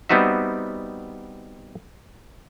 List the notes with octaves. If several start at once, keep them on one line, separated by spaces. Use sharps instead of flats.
G3 B3 C4 D#4 F#4 E5